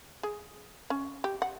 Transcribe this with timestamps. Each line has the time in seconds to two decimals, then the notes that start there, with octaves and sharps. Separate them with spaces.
0.23 G#4
0.90 C#4
1.24 G4
1.42 F#5